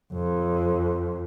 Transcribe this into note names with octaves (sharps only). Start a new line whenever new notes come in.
F2